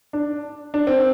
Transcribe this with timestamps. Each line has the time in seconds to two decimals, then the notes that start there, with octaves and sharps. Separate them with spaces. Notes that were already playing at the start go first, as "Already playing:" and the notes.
0.13 D4
0.74 D4
0.87 C4